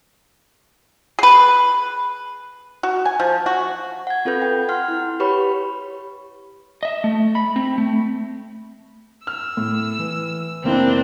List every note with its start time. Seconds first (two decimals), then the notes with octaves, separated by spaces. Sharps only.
1.19 G#4 B4
2.83 F#4
3.06 G#5
3.20 F3
3.46 F#4
4.07 F#5 G#6
4.25 C4 F4 A4 B4 G6
4.42 G5
4.69 F#5 C6 F6
4.88 E4
5.20 G4 B4 C#5 B5 C#6
6.83 D#5 E5
7.04 A3
7.35 B5
7.56 C4
7.78 A3
9.27 E6 F6
9.57 A2
9.99 E3
10.64 F1 A#3 C4 D4 E4